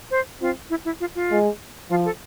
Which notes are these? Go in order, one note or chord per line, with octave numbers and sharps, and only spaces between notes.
C5
C4 F4
E4
E4
F4
F4
G#3
F3 F4
A4